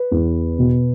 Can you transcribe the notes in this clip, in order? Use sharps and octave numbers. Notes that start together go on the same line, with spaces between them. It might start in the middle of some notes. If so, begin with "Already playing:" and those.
Already playing: B4
E2
B2